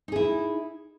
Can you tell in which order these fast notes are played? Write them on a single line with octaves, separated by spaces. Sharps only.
D#4 G#4 E4